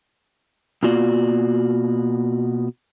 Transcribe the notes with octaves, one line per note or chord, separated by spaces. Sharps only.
B2 A#3 F4 F#4 D5